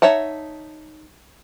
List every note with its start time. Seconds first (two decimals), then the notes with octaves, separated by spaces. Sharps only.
0.02 D#4 C#5 E5 F#5 A5